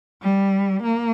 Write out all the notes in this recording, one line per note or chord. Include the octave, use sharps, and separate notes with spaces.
G3
A#3